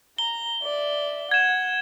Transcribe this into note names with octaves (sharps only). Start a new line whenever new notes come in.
A#5 G7
D5 E5
F#5 G#6 E7